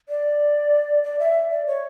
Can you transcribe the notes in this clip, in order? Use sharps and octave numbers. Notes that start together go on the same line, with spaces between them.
D5
D5
E5
D5
C#5